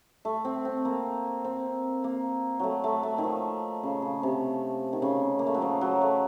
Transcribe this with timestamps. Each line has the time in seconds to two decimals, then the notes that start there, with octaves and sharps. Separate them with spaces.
0.25 A3
0.45 C4
0.65 C4
0.85 A#3
1.44 C4
2.04 A#3
2.59 F#3 A3
2.84 A3
3.03 A3
3.18 D#3
3.24 F3
3.83 C#3
4.02 C#3
4.23 C3
4.93 D#3
5.02 C#3
5.39 A#3
5.47 A3
5.54 F#3
5.62 F3
5.81 F#3
6.01 A3